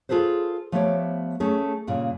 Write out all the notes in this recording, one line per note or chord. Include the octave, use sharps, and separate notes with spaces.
F4 G#4 A4 B4 C5
F3 A3 B3 G4 C#5 D5
A3 C#4 G#4 A4
G2 A#2 C#3